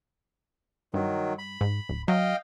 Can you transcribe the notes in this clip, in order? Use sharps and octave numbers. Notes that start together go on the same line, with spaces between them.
G2 D#3 F#3
B5
G#2
D1
F#3 D#5 F5 G5